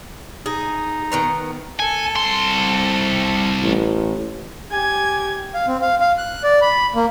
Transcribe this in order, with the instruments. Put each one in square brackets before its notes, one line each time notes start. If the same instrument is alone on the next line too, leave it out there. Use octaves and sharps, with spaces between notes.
[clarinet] D#4 [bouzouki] G#4
[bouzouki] D#3 B3 A#5
[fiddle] A4 [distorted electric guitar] G#5
[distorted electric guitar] C2 C6
[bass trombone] A1
[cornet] G4 [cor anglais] G#5 [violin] G#6
[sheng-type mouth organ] F5
C4
F5
F5
F#6
D5
B5
A#3